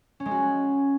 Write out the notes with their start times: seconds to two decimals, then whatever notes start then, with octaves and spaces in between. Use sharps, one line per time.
0.20 C#4
0.26 G#3
0.31 F#4